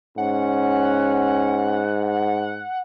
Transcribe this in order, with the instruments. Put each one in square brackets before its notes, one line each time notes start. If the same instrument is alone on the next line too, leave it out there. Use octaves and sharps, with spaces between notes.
[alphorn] G#2 [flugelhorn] C#4 [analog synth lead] F#5